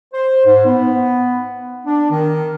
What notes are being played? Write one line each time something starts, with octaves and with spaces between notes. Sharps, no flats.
C5
G#2
B3
D4
D#3